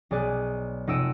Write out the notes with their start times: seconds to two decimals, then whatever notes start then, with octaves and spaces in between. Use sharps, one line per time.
0.11 B1 G#4 D5 F#6
0.87 F1 D#4 F#5 E6 D7 D#7